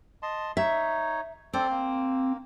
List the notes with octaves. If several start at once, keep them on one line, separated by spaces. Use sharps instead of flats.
D#5 A5 C6
D#4 C#5 E5
C4 A4 C5 D5
A#3